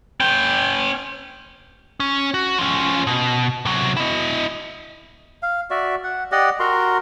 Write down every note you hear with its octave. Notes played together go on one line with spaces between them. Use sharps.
C#4 G5
C#4
F#4
F3 C#4
B2
C3 F#3
E4 D#5
F5
F#4 D5 E5
F#5
G4 D5 D#5 F#5
F#4 A#4 A#5 C6